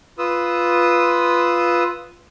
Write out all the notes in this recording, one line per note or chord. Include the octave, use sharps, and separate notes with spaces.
F4 B4 D#6 E6